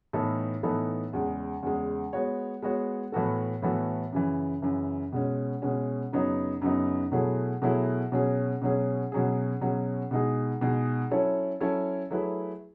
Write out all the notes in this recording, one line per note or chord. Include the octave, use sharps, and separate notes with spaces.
A2 E3 B3 D#4 A4
A2 E3 B3 D#4 A4
E2 C#3 G#3
E2 C#3 G#3
G#3 B3 F#4 C#5
G#3 B3 F#4 C#5
A2 E3 B3 F#4 A4
A2 E3 B3 F#4 A4
F#2 C#3 E3
F#2 C#3 E3
B2 G#3 C#4
B2 G#3 C#4
F#2 C#3 F#3 B3 D#4
F#2 C#3 F#3 B3 D#4
B2 F#3 A3 E4 G#4
B2 F#3 A3 E4 G#4
B2 F#3 C#4 G#4
B2 F#3 C#4 G#4
B2 F#3 C#4 G#4
B2 F#3 C#4 G#4
B2 G#3 D#4 G#4
B2 G#3 D#4 G#4
F#3 C#4 E4 A4 C#5
F#3 C#4 E4 A4 C#5
F#3 A3 E4 G#4 B4